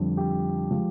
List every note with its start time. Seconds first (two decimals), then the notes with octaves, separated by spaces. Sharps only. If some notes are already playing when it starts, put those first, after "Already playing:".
Already playing: F2 D3 G3
0.17 G4
0.71 F3 G#3